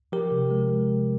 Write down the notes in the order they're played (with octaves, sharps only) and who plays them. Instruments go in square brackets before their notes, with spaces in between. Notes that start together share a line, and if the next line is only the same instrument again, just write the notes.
[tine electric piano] F3 G4 A#4
C3
G#3